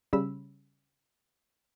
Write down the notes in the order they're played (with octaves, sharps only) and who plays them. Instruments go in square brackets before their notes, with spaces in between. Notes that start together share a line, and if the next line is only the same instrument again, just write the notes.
[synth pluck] C#3 G3 B5 E6